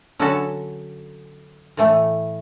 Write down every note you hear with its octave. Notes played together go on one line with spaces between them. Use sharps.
D3 F#3 C#4 F#4 A4
A2 E3 A3